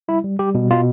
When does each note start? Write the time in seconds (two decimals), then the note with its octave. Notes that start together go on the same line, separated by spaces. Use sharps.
0.08 G3 E4
0.24 G3
0.39 G3 G4
0.55 B2
0.71 B2 F4